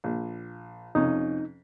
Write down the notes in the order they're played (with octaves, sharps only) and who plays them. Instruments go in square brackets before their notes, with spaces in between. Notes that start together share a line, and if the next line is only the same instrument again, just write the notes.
[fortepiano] A#1
[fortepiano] F2 C3 C#4 [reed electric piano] D#4